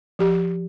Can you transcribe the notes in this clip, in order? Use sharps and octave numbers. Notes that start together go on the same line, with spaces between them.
F3 G4